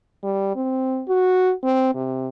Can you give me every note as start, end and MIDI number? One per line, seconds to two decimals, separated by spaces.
0.24 0.53 55
0.56 1.03 60
1.09 1.53 66
1.64 1.95 60
1.95 2.28 48